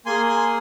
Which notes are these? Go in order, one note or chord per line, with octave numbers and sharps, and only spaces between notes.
A#3 G#4 G#5 C6
G#5 C6